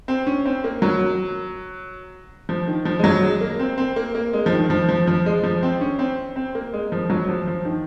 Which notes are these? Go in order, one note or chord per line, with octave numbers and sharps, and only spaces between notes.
C4
C#4
C4
A#3
F#3
F3
D#3
F3
G#3
F#3
G#3
A#3
C4
C4
A#3
A#3
G#3
F3
D#3
F3
F3
F3
G#3
F3
C4
C#4
C4
C4
A#3
G#3
F3
F#3
F3
F3
D#3